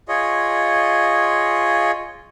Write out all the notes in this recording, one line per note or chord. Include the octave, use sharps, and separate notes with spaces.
F4 G#4 C#5 D#5